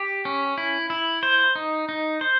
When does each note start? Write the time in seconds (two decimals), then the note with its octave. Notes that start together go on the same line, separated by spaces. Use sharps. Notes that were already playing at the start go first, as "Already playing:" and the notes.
Already playing: G4
0.25 C#4
0.58 E4
0.90 E4
1.23 C5
1.56 D#4
1.89 D#4
2.21 C5